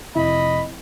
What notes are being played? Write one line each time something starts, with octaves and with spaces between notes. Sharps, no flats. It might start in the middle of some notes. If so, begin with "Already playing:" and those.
F1 E4 D#5 B5